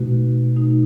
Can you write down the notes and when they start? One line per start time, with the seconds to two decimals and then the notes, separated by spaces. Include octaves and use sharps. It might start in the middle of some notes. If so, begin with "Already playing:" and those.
Already playing: B2 A3 D#4 F#4
0.57 B2 A3 D#4 F#4